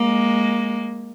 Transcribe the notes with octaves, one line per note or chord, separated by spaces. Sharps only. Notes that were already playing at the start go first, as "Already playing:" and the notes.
Already playing: G#3 A#3